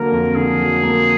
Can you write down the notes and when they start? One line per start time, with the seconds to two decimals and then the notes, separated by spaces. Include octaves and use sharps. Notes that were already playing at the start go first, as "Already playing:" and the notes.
Already playing: D3 F#3 A#3 A#4
0.12 F2
0.35 D3 G#4
0.59 F#3
0.83 A#3